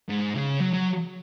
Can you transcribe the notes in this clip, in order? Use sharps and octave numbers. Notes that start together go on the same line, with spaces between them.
G#2
C#3
F#3
F#3